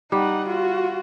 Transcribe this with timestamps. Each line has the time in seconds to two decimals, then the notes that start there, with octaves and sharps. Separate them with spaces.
0.12 G3 D#4 F#5
0.47 F4 F#4